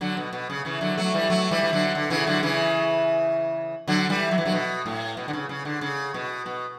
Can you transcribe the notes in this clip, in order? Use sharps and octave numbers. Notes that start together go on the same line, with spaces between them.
D3 F#3
B2
B2
C#3
C#3 E3
D3 F#3
F#3 A3
E3 G3
F#3 A3
E3 G3
E3
D3 F#3
D3
C#3 E3
D3 F#3
C#3 E3
D3 F#3
E3 G3
F#3
E3
D3 F#3
B2
A2
B2
D3
C#3
C#3
D3
C#3
B2
B2